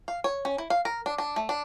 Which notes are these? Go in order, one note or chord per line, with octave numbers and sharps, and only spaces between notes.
F5
C#5
C#4
E4
F5
A#4
D4
D4
A3
D4